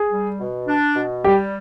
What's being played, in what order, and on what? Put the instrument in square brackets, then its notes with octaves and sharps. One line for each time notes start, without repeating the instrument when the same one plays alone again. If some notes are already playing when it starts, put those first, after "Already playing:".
Already playing: [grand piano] G#4
[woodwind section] G3
B2
D4
B2
[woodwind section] G3 [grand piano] G4